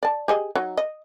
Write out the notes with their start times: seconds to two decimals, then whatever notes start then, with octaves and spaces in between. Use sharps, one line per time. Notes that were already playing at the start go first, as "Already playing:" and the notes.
0.03 D5 A5
0.28 G4 G#4 D#5
0.55 F#3 D#4
0.77 D#5